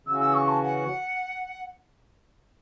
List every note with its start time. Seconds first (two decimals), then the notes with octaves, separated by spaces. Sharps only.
0.06 C#3 E3 C#4 F#4 E6
0.20 E6
0.34 C#6
0.48 A5
0.62 F#5